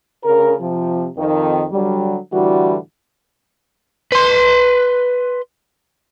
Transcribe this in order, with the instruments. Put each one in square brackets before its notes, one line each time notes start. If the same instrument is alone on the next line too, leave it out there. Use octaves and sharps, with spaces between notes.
[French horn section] D2 C#3 A#4
C3 F3
F2 D#3
D3 F#3 G3
A2 D3 E3 G3 F#4
[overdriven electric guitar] B4 C6